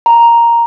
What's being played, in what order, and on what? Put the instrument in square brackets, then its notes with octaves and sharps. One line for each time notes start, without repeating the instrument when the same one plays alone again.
[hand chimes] A#5